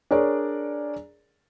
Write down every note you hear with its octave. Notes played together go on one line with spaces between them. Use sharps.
D4 G#4 A#4 C#5 D5